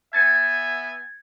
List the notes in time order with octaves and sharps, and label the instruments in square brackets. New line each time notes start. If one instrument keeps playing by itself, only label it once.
[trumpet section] B3 E5 G#5 [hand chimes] G#6 A6 C#7